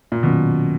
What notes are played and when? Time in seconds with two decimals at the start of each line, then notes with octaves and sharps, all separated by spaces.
0.12 A#2
0.23 B2 D#3 F#3 C#4